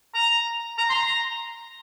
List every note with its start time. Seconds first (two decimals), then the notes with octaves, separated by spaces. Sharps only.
0.14 A#5
0.78 A#5
0.90 C6
0.94 A#5